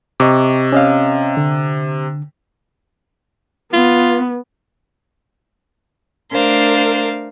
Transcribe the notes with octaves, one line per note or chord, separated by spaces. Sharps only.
C3 D#5 C#6 D6
C#4 D#5 F5
D3
B3 F4
A3 D4 A#4 C5 F5